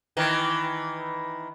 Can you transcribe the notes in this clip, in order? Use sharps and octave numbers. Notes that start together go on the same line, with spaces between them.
D#3 E3